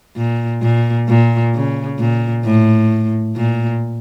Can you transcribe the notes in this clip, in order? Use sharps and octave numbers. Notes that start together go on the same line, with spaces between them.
A#2
A#2
A#2
C#3
A#2
A2
A#2